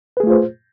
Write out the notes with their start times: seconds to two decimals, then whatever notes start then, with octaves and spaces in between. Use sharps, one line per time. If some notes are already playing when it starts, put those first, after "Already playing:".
0.17 B4
0.20 G#4
0.23 A3
0.27 F4
0.30 C5